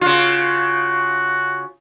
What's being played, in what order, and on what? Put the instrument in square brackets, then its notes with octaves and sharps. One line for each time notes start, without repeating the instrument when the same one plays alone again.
[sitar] C#3 F4 [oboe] F#4